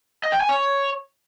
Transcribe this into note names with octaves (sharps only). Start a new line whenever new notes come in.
D#5
G5
G#5
C#5